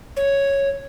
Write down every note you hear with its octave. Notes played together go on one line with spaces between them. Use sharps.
C#5